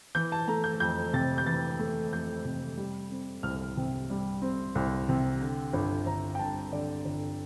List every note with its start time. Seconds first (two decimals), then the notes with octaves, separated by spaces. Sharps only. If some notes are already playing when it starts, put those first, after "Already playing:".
0.15 E3 G6
0.32 A5
0.47 A3 A#5
0.64 G6
0.80 F2 G6
1.13 C3 A6
1.38 G6
1.46 E3 A6
1.79 A3
2.13 F2 G6
2.45 C3
2.77 G3
3.11 C4
3.43 C2 F6
3.77 C3
4.10 G3
4.42 C4
4.75 C2
5.09 C3
5.41 D3
5.73 G1
6.06 G1 A#5
6.35 G5
6.39 G2 A5
6.72 D3 D5
7.05 G1